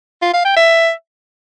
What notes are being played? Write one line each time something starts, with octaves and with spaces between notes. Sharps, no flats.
F4
F5
G5
E5